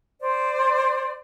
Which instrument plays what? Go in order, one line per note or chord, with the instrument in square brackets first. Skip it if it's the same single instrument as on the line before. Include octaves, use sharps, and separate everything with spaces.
[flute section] C5 D5